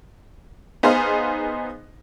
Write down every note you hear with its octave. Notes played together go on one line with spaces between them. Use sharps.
B3 D#4 G#4 C5 F5